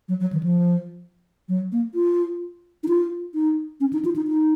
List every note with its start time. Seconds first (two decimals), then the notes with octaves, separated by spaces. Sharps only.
0.08 F#3
0.20 F#3
0.33 D#3
0.43 F3
1.49 F#3
1.72 A#3
1.95 F4
2.83 D#4
2.88 F4
3.34 D#4
3.80 C#4
3.93 D#4
4.05 F4
4.16 D#4
4.27 D#4